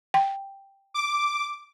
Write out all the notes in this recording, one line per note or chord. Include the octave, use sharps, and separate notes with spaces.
G5
D6